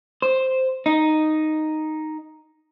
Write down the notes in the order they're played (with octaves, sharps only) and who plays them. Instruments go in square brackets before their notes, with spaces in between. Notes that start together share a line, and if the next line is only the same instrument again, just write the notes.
[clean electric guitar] C5
D#4